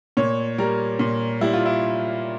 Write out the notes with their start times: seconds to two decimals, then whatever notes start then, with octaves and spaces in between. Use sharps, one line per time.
0.17 A#2 C#5
0.58 G3 A#4
0.99 A#2
1.41 G3 E4
1.53 F4
1.66 E4